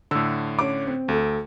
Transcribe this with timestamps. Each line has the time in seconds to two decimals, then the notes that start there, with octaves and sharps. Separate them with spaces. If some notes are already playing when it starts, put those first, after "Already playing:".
0.11 A2 D3 E6
0.59 C#4 D6
0.87 C4
1.08 D2 A3 A4